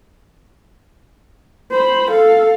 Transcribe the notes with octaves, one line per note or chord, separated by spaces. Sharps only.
C5 B5
A4 F5